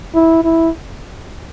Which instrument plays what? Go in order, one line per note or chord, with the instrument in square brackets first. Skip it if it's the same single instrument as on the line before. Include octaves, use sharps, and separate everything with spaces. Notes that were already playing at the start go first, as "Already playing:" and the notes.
[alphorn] E4
E4